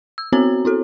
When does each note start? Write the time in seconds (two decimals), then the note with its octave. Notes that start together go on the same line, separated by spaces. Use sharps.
0.18 E6
0.32 B3 C4 F#4 C5 C#5 A#5
0.65 E4 F#4 A4